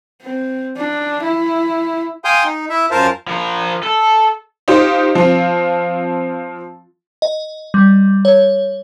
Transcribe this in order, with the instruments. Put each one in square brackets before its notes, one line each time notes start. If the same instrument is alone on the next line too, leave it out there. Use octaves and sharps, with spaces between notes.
[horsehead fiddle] C4
D4
E4
[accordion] F5 G5 G#5 C6 D#6 G6
D#4
E4 E5
F#2 F4 A#4 C5 F5 A5
[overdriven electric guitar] F3 A#4
A4
[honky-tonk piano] D#4 F4 G4 C5
F3 C4 F4
[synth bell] D#5
G3
C#5